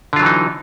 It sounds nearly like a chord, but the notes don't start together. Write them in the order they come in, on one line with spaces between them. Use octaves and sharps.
D3 F4 F#3 E3 D#4